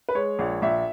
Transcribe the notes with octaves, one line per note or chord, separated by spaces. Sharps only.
B4
G#3 C#5
A#1
A#1 E5